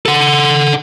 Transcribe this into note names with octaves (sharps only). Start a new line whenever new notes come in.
A4 F#5